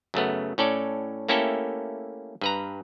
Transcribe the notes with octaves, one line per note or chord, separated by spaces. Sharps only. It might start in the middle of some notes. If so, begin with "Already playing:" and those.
F#2 C#3 A3 B3
A2 C#4 A4 D5
A3 A#3 C#4 E4 G4 A4
G2 B4 A#5